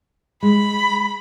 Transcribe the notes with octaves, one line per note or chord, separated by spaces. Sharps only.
G#3 B5